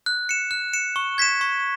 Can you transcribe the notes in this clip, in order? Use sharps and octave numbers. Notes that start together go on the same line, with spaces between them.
F#6
C#7 E7
F#6
C#7 E7
C#6
G#6 B6 E7
C#6